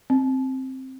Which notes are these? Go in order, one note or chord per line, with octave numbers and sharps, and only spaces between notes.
C4